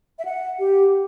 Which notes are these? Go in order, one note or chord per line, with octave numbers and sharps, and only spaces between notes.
E5
F#5
G4